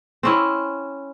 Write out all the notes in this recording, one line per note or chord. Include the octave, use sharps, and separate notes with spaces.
C4 C#4 E4